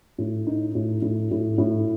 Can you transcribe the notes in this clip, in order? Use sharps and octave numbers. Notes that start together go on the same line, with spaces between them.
A2
D#4
A2
A2
A2
A2